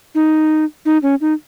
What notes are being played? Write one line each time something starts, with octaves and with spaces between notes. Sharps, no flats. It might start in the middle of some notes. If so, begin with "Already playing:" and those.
D#4
D#4
C#4
D#4